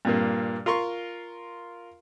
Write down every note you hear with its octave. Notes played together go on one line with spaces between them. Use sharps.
G2 A#2 A#3
F4 A#4 C6 C#6